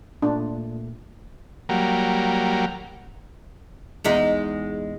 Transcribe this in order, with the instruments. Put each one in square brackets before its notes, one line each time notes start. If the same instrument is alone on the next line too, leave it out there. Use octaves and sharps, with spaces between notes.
[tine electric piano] A#2 A3 [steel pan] D4
[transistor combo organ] F#3 G3 A#3
[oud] E2 G#3 D#4